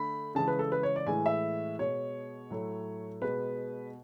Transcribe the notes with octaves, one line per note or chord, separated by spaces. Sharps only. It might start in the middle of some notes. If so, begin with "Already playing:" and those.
Already playing: D3 A3 B5
C#3 E3 G#3 A5
B4
A4
B4
C#5
D5
A2 E3 G#3 G#5
E5
B2 G#3 C#5
A2 F#3 A3
B2 G#3 B4